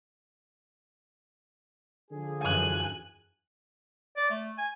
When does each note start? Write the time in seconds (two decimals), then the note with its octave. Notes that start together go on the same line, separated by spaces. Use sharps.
2.11 D3 F3 G#4
2.42 F#2 E3 G#5 F#6
4.16 D5
4.30 A3
4.58 G#5